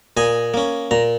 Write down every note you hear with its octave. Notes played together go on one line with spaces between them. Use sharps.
A#2 D#5 G#5
A#3 C#4
A#2 A#5